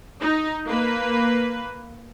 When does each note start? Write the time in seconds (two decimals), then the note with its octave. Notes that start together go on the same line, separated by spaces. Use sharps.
0.19 D#4
0.66 A#3 B4